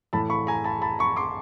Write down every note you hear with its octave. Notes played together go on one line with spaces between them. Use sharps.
A2 E3 A3 A5 B5
B5 C#6
G#5 A#5
A5 B5
A5 B5
B5 C#6
C6 D6